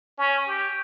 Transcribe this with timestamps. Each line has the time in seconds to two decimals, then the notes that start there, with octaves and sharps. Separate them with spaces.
0.18 C#4
0.47 G4